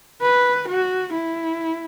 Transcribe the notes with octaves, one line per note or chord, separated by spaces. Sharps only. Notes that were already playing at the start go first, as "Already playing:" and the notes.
B4
F#4
E4